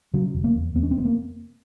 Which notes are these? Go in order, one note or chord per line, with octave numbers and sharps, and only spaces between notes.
C#3 F#3
F1
A#3
E2
E2 B3
C#4
C4
F1 B3
A#3